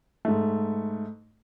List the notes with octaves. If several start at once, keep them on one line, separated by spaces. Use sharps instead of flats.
G#2 A3